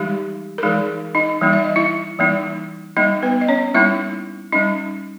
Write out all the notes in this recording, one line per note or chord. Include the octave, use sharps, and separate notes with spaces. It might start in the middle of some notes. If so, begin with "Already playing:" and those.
Already playing: E3 G3 G#3 D#4 G4
A#4
E3 G#3 D#4 G#4
D#4 D#5
E3 G3 A#3 D#4
E5
D#5
E4 E5
E3 G3 A#3 D#4
G3 A#3 D#4 D#5
B3 B4
D#5
C#4 C#5
G3 A#3 D#4 E4 E5
G3 C#4 D#4 D#5